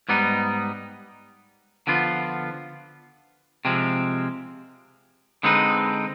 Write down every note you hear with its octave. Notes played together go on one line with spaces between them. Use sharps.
G#2 G3 B3 D#4
D3 F3 B3 F4
C3 F3 G#3 C4
D3 G#3 C4 D#4 B4